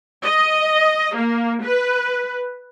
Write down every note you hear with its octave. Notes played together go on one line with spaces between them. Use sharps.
D#5
A#3
B4